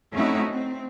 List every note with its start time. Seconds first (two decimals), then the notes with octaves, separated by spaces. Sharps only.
0.13 A3 C4 C#4 D#4 E4 F#4
0.50 C4